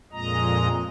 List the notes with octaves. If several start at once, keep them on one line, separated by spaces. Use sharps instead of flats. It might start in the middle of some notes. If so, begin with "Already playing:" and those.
F2 A#2 G#3 D#5 A#5